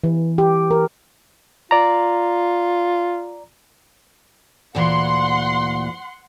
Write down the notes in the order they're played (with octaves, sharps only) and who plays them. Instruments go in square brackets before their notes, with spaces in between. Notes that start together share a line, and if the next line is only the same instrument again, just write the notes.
[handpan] E3
G4
A#4
[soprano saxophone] F4 [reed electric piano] D5 A#5
[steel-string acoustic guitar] D2 A#2 E3 [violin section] F#5 C6